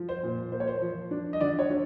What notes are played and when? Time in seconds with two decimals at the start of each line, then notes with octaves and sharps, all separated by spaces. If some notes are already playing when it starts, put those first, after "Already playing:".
Already playing: F3
0.09 C5
0.23 A#2
0.52 A#3 C5
0.60 C#5
0.68 C5
0.81 F3
1.11 D4
1.33 D#5
1.41 D3 D5
1.59 C#5
1.70 D3